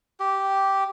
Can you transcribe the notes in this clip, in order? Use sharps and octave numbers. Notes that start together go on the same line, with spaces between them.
G4